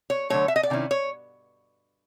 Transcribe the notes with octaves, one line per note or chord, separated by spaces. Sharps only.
C#5
D3 F#3 A3 C#5
E5
D#5
D5
C3 D#3 C#4 E4
C#5